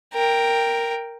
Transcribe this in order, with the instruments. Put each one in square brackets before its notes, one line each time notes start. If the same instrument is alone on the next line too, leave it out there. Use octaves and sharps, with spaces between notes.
[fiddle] A#4 G5